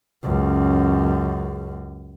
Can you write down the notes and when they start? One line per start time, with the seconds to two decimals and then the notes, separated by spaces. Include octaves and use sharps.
0.23 C#2 F#2